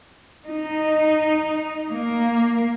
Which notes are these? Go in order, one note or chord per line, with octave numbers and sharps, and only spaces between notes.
D#4
A#3